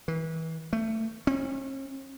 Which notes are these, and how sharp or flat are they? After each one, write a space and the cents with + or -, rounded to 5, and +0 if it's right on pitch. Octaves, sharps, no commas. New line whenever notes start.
E3 -30
A3 +20
C#4 -45